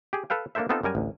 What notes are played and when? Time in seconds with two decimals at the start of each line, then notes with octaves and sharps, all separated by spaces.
0.13 G4 G#4
0.30 A4 B4 F5 G5
0.55 A#3 D4 A4 A#4 C5 E5
0.69 B3 C4 D#4 F4 A4
0.83 F#2 G3 A#4 G#5
0.95 A1 D2